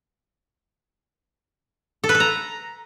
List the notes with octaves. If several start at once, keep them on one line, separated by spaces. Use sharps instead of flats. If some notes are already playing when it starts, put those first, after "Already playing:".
A4
B4
A4
A#5